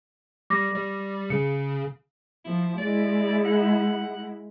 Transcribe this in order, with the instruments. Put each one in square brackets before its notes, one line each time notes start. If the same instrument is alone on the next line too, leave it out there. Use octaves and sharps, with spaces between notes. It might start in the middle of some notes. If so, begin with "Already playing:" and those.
[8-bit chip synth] G3 [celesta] D6 A#6
[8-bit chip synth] G3
[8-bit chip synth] C#3 [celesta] C#7
[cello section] F3 [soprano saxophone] E4
[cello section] G#3 E4 [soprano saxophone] D5
[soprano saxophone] F#5